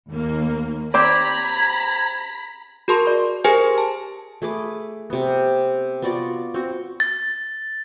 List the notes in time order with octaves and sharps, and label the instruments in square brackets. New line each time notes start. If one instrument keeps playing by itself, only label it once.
[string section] D#2 A#3
[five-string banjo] C4 G4 D5 [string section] A#5 B5 B6 [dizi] G#6
[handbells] F#4 G#4 A#4 A5 C6
D5
G4 G#4 A#4 C5 G#5
A5
[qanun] A3 G#4 B4 D6
C3 B3
B3 F4 F#4 D5
C4 F#4
[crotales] A6